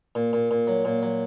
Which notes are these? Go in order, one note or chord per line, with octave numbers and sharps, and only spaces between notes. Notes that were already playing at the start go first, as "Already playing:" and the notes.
A#2
A#2
A#2
F#3
A#2
F#3